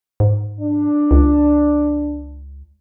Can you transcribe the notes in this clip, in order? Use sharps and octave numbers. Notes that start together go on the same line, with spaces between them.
G#2
D4
C#2